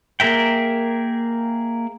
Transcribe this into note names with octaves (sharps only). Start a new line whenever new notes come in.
A#3 G#4 A#4 E5 G5